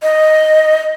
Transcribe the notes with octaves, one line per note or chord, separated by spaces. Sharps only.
D#5